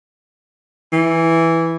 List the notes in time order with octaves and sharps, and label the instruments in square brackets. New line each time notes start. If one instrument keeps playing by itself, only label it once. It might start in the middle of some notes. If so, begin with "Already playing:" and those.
[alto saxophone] E3